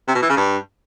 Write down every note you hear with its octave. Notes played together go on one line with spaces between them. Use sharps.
C3
B2
E3
C#3
G2